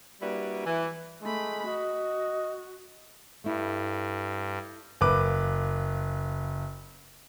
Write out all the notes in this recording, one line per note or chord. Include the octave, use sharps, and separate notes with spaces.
G3 A#3 D4 E4 F#4 B4
E3
G#3 A3 B5
F#4 D#5
G2 A3 E4
F#1 B4 D6